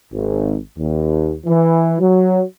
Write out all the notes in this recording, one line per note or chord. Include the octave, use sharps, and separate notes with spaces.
G#1
D#2
E3
F#3